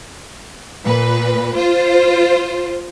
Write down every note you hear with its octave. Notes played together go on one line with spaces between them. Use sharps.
A#2 B4
F4 C5